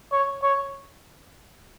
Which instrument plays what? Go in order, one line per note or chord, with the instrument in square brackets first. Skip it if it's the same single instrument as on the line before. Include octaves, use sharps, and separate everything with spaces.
[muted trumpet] C#5
C#5